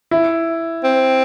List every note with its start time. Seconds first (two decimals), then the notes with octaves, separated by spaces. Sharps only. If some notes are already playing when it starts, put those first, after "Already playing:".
0.11 E4
0.83 C4